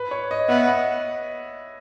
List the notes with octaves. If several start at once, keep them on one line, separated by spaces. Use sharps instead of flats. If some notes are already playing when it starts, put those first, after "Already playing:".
Already playing: B4
C#5
D#5
B3 E5
D#5